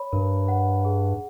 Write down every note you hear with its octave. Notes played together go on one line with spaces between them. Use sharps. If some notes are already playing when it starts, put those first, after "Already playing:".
Already playing: C#5 B5
G2 A#4
F#5
G#4